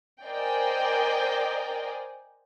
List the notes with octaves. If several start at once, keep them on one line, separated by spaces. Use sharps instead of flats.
A#4 C5 D5 D#5 G5 G#5